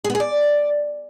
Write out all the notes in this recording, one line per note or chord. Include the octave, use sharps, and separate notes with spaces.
G#4
B3
G#4
D5